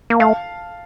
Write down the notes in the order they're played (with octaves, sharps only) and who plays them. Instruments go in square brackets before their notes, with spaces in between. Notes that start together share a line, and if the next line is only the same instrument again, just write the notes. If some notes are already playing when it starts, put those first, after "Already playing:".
[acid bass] A#3
[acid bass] A3 [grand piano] F5 A5